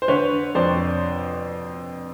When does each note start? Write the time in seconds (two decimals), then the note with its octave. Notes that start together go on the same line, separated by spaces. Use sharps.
0.02 C5
0.08 D3 B4 C#5
0.55 F2 C5 D5